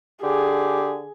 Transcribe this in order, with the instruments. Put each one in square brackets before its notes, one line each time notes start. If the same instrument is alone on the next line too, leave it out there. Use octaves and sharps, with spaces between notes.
[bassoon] D3 [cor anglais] G4 [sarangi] G#4